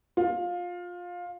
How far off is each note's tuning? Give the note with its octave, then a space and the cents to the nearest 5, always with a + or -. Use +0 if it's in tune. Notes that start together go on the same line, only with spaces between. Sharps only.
F4 +20